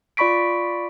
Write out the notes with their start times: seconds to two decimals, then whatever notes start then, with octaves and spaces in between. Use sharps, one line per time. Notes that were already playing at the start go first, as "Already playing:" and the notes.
0.17 F4 D5 B5 C#6 B6 D7